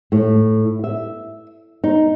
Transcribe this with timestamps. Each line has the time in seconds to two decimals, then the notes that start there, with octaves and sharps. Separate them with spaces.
0.12 A2
0.84 E5
1.84 D#4